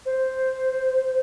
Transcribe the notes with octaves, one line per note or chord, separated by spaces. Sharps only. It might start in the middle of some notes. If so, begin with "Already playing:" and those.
C5